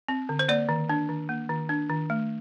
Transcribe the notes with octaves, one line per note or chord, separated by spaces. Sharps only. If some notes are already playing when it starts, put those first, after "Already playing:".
C4
D3
C5
A#3 D5
D#3
D4
D#3
A#3
D#3
D4
D#3
A3